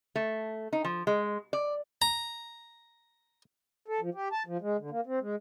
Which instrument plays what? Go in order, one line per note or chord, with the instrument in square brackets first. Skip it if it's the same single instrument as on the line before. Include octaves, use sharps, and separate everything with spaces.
[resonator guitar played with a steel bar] A3
D#4
F3
G#3
D5
[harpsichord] A#5
[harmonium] A4
F3
G4
A5
F3
G#3
D3
A#3
C4
G#3